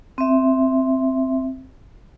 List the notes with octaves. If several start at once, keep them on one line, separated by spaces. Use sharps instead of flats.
C4 E5